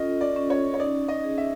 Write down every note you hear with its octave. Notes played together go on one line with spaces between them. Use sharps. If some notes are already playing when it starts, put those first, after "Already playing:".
Already playing: C#4 F4 A4 D#5
D5
C#4
C#5
C#5
D#4 D5
D#5
G#4
E5